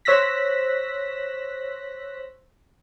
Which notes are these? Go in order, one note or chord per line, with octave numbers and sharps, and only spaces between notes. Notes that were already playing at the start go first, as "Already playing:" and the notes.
C5 C#5 E6 F#6 A#6 B6